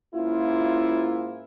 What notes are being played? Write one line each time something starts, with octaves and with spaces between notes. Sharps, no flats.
G#2 A#3 C#4 E4 F4